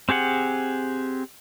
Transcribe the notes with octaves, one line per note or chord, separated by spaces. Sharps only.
C4 G4 G#4 F#5